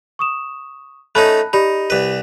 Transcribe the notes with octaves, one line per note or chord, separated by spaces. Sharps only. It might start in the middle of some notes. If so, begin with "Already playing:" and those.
C#6 D#6 E7
A3 C#4 D#4 A5 B5 F#6
D#4 G4 D5 B5
C2 B4